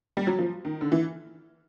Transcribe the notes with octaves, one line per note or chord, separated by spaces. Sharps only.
G3
F#3
F3
D#3
D3
E3